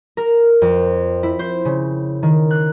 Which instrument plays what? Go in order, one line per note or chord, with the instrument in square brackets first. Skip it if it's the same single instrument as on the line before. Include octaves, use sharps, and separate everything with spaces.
[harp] A#4
F2
E4
C5
C#3
D#3
F#6